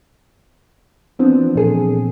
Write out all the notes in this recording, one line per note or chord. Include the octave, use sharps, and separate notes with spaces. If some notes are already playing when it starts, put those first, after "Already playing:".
E3 F3 B3 C4 D4
A#2 G#4 A4